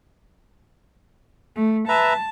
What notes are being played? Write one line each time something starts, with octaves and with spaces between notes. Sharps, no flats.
A3
B4 E5 A5 A#5